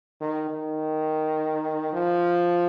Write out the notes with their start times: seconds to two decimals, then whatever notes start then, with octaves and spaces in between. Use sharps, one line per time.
0.20 D#3
0.49 D#3
1.93 F3